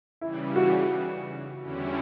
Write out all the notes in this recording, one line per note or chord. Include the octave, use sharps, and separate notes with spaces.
C#3 E3 G3 E4
F#4
E2 D3 G3 C#4 E4